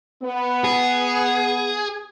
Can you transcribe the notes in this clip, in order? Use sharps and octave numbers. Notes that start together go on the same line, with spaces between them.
B3
G#4